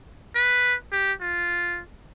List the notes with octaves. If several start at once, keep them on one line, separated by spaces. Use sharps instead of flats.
B4
G4
F4